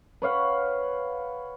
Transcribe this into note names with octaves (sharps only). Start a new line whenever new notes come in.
B4 C#5 F5 F#5